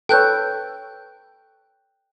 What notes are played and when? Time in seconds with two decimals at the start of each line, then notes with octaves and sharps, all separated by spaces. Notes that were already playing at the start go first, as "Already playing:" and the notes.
0.09 A4 B4 C#5 G5 F#6 G6